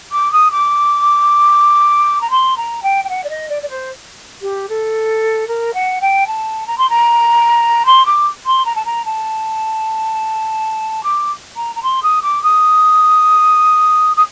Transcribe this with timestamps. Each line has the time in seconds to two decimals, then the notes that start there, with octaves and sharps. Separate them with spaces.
0.12 D6
0.32 D#6
0.51 D6
2.21 A#5
2.30 C6
2.57 A#5
2.83 G5
3.04 G5
3.09 F#5
3.24 D5
3.30 D#5
3.49 D5
3.63 D5
3.69 C5
4.42 G4
4.69 A4
5.48 A#4
5.74 F#5
6.01 G5
6.27 A5
6.67 A#5
6.78 C6
6.90 A#5
7.86 C6
8.06 D6
8.46 C6
8.65 A#5
8.75 A5
8.85 A#5
9.05 A5
11.04 D6
11.56 A#5
11.76 A#5
11.83 C6
12.03 D#6
12.22 D6
12.43 D#6
14.17 D#6